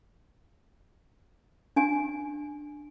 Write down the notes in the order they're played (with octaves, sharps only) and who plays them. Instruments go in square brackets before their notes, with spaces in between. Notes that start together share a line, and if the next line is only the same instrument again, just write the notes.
[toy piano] D4 G#5